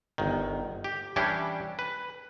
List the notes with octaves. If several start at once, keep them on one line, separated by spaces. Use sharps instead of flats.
G1 D#3
G4
E3 G3 C#4 D4 E4 G4
B4